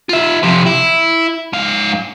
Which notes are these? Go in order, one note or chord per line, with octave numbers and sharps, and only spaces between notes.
F4 E5
F2 C3
E4
G#2 F5